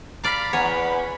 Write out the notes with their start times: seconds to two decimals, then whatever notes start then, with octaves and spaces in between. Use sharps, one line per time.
0.24 D5 F5 A#5 B5 F6 B6
0.53 E2 C#5 F#5 G#5